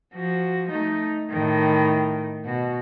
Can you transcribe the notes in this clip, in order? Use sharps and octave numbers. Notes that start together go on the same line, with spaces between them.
F3 F#4
A3 D#4
A2 D#3
B2 F#4